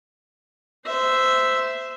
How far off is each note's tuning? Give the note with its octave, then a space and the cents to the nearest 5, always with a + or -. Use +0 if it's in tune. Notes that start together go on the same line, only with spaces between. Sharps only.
C5 -15 E5 +0